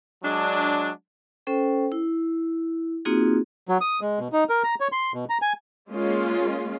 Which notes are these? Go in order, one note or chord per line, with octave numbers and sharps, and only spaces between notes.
F#3 G#3 D4
C#4 A4 C5 G5
E4
A#3 C4 D#4 F4 F#4 G#4
F#3
D#6
G#3
B2
D#4
A#4
A#5
C#5
C6
B2
A#5
G#5
G#3 A#3 C#4 F4